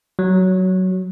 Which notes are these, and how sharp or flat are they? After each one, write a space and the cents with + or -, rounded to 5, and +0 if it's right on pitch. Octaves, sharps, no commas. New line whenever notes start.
F#3 +10